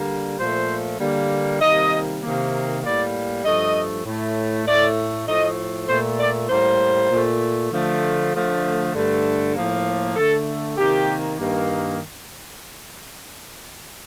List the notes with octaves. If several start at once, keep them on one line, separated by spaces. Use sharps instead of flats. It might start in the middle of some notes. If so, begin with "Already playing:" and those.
Already playing: D3 G3 A#3
A#2 F3 A3 C5
D3 G3 A#3
C3 D#3 G3 A#3 D#5
C3 D#3 A#3
A2 G3 A#3 D5
G2 F3 A3 D#5
A2 A3
A2 A3 D5
A2 F3 A3 D#5
A#2 A3 C5
D5
A2 G3 A#3 C5
A#2 A3
D3 F3 A3
D3 F3 A3
G2 D3 A3
A2 F3 A#3
D3 A3 A4
C3 D#3 A#3 G4
G2 D#3 A#3